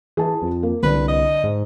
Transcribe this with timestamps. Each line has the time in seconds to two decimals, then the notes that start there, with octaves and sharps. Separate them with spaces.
0.17 E3 G#4 A5
0.42 F2
0.63 A#3
0.83 C2 D3 B4
1.08 D#5
1.44 G#2